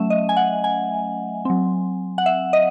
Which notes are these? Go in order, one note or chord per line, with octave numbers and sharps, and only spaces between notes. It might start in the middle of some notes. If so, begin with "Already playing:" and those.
Already playing: F#3 A3 C#4 E5
D#5
G#5
F#5
G#5
F#3 C4
F#5
E5
D#5